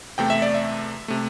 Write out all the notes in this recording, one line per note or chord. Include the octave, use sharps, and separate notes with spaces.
E2 C3 A3 G5
E5
D5
E5
C3 A3